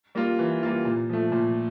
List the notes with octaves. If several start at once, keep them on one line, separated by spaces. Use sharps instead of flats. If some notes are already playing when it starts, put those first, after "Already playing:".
G3 A#3 F4
E3
G3 A#3 F4
A#2
F3 A3
A#2